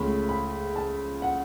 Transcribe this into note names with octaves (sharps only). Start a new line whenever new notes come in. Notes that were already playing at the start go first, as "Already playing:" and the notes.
Already playing: C#2 C#3 A3 C#4 B5
B5
A5
F#5